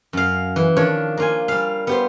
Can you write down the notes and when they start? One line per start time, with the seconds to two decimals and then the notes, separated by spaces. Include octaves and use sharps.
0.13 F#2 F5
0.56 E3
0.77 D#3 F3 D4 C#5
1.17 A#3 F4 G#5
1.48 G3 F5
1.87 B3 G4 C5